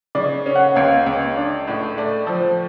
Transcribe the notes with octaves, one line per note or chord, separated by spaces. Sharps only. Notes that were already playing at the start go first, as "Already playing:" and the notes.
C#3 D5
C#4
F#5
C#2 F5
C#2
D4
A2
A3 D5
F3